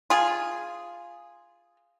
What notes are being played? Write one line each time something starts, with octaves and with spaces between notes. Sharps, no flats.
F4 G#4